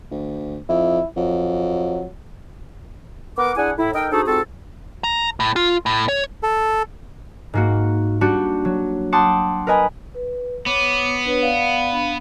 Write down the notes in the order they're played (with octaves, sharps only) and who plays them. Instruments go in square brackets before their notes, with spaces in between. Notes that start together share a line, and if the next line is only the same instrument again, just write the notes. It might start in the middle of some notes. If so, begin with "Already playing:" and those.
[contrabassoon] D2
[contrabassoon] F2 [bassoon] E4
[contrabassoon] F2 [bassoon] F#3
[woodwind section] B3 A#4 F#5 D6
D4 E4 G#4 F#5 G#5
A2 E4
D#4 A4 A#4 D#5 G5
C4 D4 D#4 F#4 G#4 A4
G#2 C4 F4 F#4 A4
[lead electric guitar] A#5
A2
F4
A2
C#5
[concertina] A4
[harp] G#2 A#3 F#4
G3 D4 F#4 G4
F#3
F#5 G5 A5 C6 D6 D#6
A#4 B4 D#5 G#5 B5
[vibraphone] B4
[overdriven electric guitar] B3 [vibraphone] C#5 D6
[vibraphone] D4 B4 C#5
D5 F5 F#5
D4 F5 B5